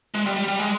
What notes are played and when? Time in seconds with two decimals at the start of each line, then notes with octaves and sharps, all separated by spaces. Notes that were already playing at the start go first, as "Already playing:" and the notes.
0.14 G#3
0.26 G3
0.36 G3
0.48 G3
0.59 G#3